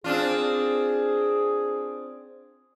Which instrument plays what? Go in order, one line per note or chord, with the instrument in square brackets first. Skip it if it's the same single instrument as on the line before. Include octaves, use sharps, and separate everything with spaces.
[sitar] C4 D4 F4 [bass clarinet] G#4